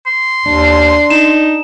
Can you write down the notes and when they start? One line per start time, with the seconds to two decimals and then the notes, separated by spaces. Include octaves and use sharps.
0.06 C6
0.46 D#2 D4
1.10 D#4 E7